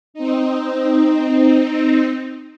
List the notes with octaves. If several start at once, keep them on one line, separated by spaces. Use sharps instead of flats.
C4 D#4